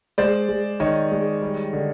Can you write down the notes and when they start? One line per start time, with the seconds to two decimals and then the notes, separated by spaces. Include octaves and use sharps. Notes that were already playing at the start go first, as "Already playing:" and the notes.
0.18 G#3 C5 D5
0.49 G#3
0.80 D#3 C#5 D#5
1.11 G#3
1.42 G3
1.73 D3